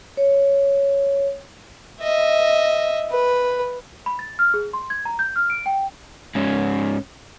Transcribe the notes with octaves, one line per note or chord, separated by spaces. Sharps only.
C#5
D#5 E5
B4
B5
A6
F6
G#4
C6
G#6
A#5
G6
F6
D7
G5
G#2 C#4